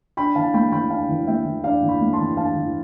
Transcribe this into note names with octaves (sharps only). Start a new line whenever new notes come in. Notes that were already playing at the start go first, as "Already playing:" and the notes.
D4 G5 B5
E3 F5 A5
A3 G5 B5
E3 G5 B5
D4 F5 A5
E3
A3 E5 G5
E3
D4 D5 F5
E3
G5 B5
A3
A5 C6
E3
D4 F5 A5
E3